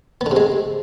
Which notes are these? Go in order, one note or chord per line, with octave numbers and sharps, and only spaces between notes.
B3
D3
C3
G#3